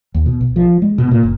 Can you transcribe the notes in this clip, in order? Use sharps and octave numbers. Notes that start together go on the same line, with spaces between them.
D#2
B2
B1
F3
G#3
B2
A#2
F#1